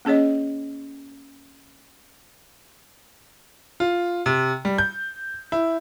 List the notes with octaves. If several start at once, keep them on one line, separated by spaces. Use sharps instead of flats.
A#3 C#4 G#4 C#5 D#5
F4
C3
G3
G6
E4